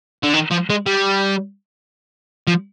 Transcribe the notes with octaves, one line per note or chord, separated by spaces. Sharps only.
D3
D#3
F3
G#3
G3
F3